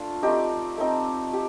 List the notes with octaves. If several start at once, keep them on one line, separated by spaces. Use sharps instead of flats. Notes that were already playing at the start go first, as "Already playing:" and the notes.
Already playing: A3 D4 F4
A3 C4 D#4 G4
A3 C4 D#4
G4